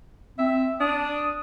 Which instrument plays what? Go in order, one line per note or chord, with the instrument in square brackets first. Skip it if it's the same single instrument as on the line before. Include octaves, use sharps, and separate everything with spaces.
[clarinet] C4 [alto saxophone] E5
[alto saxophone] D4 [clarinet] D#6